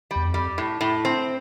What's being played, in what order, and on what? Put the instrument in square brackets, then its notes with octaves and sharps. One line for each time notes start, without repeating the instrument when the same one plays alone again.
[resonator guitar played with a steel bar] G3
[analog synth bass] E2
F2
[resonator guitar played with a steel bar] G3
A2
A2
C4